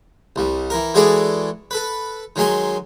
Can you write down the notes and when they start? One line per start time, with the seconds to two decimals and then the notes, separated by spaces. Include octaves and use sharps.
0.36 C2 G3
0.70 E3 A#4
0.94 E3 G#3 F#4 G#4 A4 D5
1.71 A4 B4
2.36 D#3 F#3 G#3 G#5 C6